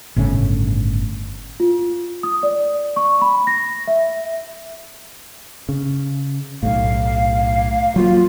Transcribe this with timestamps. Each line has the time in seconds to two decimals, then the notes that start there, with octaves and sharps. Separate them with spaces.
0.16 G1 A2 C#3 C#4
1.60 F4
2.23 D#6
2.43 D5
2.96 C#6
3.21 B5
3.47 A#6
3.87 E5
5.69 C#3
6.63 B1 A2 F5
7.96 F#3 A#3 F4